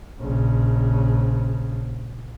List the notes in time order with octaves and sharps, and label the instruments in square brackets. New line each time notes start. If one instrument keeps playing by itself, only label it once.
[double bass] A#1 C#3